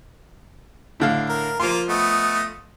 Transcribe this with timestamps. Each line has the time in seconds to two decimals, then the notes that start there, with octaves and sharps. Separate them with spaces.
1.00 A2 D3 F5
1.29 A#4
1.60 F3 A#3 F4 C6
1.88 A3 B3 D#5